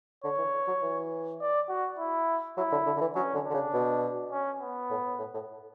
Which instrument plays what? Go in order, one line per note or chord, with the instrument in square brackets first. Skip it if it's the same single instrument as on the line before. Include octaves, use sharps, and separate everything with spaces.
[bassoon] D3 [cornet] C#5
[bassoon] E3
F#3
E3
[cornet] D5
F#4
E4
[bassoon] F#3 [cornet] E4
[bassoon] D3
D3
D3
E3
[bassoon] F#3 [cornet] C#4
[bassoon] D3
[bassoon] D3 [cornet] D4
[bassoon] C#3
B2
[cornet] C#4
B3
[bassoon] A2
A2
A2